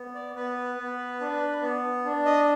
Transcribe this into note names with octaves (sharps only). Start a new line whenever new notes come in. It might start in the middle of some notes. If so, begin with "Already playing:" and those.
Already playing: B3
D5
B3 B4
B3
D4
B3
D4
D#5